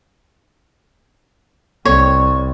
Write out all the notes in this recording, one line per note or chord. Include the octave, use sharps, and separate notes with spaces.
C2 C#5